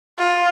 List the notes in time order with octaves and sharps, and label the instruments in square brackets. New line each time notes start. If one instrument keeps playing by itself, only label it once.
[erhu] F4